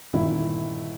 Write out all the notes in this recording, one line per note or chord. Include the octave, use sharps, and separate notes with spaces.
G1 A#2 D#3 E4